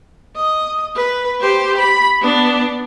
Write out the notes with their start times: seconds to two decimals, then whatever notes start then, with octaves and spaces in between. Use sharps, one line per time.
0.35 D#5
0.95 B4
1.40 G4 C5
1.77 B5
2.21 B3 D4